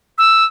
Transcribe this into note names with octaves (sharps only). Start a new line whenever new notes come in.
E6